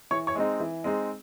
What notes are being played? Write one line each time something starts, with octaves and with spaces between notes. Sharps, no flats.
E3 C#5 C#6
C#5 C#6
G#3 C4 D#4
E3
G#3 C4 D#4